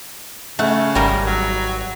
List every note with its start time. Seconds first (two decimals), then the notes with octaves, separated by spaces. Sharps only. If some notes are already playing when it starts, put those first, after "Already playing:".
0.59 C#3 A3 F#5
0.95 G#1 G3 A#4
1.27 F#3